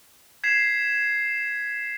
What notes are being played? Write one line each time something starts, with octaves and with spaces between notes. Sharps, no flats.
G#6 B6 C7 E7